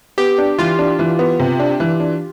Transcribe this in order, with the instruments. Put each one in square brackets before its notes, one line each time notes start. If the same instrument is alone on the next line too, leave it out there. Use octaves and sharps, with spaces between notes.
[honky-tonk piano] B3 [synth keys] G4
[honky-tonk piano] D4
[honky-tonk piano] E3 [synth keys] F4
[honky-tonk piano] D4
E3
B3
C3
D4
E3
D4